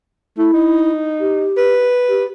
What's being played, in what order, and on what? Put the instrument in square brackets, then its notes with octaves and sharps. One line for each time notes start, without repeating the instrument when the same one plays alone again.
[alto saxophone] A3 [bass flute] E4
[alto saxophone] D#4
[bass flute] G4
[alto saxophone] B4
[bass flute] G4